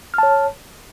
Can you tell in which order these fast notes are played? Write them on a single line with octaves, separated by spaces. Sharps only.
F6 A5 C#5